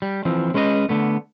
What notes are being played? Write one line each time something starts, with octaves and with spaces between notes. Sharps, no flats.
G3
E3 F3 C4
G#3 C#4 B4 C5 D#5
D3 A3 B3